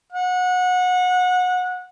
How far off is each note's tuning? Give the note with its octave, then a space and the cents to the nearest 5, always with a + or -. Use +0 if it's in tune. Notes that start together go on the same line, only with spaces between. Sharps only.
F#5 -25